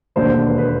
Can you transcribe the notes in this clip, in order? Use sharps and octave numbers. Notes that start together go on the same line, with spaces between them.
E1 D#2 D3 C5
B4
B4